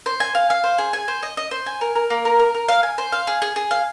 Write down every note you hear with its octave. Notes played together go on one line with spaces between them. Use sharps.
C5
G#5
F5
F5
C5
G#4
G#5
C5
D#5
D#5
C5
G#5
A#4
A#4
A#3
A#4
A#4
A#4
F5
G#5
C5
F5
G#4
G#4
G#4
F5